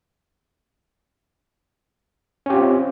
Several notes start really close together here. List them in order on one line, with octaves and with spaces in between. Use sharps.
C#4 G4 F4 C4